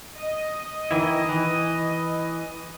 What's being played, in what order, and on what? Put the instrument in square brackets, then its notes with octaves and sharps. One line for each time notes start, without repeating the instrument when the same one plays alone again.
[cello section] D#5
[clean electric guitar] D#3 E3 E4
E3